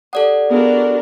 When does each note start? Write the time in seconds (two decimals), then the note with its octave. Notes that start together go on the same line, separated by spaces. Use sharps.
0.13 G4 A4 D5 F#5 D#6
0.50 B3 D4 F#4 G#4 A#4 F5